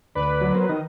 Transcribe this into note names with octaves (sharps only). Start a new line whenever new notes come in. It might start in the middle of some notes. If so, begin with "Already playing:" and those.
D2 B4 D5 B5
F#3
B3 A#4 C5
D#3 D#5